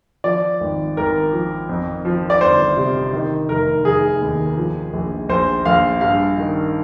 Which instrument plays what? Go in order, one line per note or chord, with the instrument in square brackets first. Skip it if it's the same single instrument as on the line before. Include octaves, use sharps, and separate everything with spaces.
[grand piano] F3 D5
G#1
G#1 A#4
F3
F2
F3
D5
G1 C5
C3
D#3
F1 A#4
F1 G#4
D#2
F3
A#1
A#1 C5
A#1 F5
G2 F5
D#3